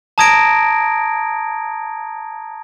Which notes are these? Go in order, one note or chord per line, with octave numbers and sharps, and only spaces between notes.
A5 A#5 D#6 G#6 A#6 D7